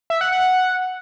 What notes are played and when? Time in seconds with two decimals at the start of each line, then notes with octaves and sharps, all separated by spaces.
0.10 E5
0.21 F#5
0.32 F#5